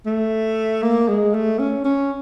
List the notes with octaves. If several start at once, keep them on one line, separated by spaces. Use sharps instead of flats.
A3
A#3
G#3
A3
C#4
C#4